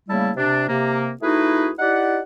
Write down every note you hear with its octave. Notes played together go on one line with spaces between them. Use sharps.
C#3 G3 A3 A#3 E4 A5
C3 D4
C3 A#3
A3 D#4 E4 F#4 G#4 B4
D#4 E4 G4 D5 F#5